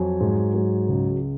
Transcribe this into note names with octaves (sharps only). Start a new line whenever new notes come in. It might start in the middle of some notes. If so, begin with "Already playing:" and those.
Already playing: F2 F#3 G#5
G#2
F#3
C#2